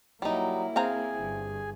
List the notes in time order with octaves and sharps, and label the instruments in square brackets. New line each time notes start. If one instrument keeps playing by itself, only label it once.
[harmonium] F#3 [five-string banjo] G3 D#4 [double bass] A#3 E4
[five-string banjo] C4 F5 A#5 [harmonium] G#4 G#5
[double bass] G1